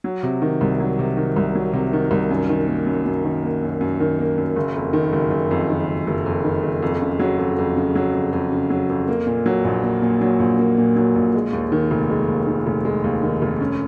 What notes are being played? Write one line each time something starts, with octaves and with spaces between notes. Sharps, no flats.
F#3
C3
D#3
C2
F#3
C3
D#3
C2
F#3
C3
D#3
C2
F#2
D#3
A#3
F#2
F#2
D#3
A#3
F#2
F#2
D#3
A#3
F#2
F#1
F2
D#3
F#1
F#1
F2
D#3
F#1
F#1
F2
D#3
F#1
F2
C#3
F#3
F2
F2
C#3
F#3
F2
F2
C#3
F#3
F2
A#3
A#2
F#3
A#1
A#3
A#2
F#3
A#1
A#3
A#2
F#3
A#1
G#3
D#2
D#3
F1
G#3
D#2
D#3
F1
G#3
D#2
D#3
F1
C#4